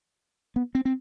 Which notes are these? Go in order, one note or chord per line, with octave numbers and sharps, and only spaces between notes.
B3
C4
C4